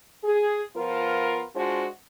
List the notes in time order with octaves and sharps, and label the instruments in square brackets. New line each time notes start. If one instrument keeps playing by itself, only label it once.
[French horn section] G#4
F3 B3 F4 A#4
G#3 D4 F4 F#4 C5